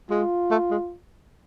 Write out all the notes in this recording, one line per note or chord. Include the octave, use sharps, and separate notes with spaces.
G#3 F4
A3
G#3